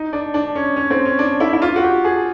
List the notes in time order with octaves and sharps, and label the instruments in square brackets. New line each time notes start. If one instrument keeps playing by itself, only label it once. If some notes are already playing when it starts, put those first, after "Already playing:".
Already playing: [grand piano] D#4
D4
D4
C#4
C#4
C4
C#4
D4
E4
E4
F4
F#4
G4
G#4